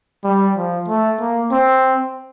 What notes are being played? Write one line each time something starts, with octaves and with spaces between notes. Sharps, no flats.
G3
F3
A3
A#3
C4